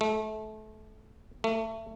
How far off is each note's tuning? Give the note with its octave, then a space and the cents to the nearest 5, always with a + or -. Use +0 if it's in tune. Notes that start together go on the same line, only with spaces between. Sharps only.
A3 -25
A3 +25